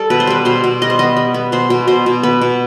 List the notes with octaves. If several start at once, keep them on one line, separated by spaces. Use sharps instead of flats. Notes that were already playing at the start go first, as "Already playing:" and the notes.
Already playing: G3 A4
B2 B4
C5
G3 B4
B2 C5
B2
G3 D#5
C5
B3 D#5
G3
B3
B2 C5
B2
B2 C5
B2
B3 B4
B2